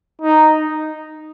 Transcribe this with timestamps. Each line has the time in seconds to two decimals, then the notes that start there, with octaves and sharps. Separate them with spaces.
0.22 D#4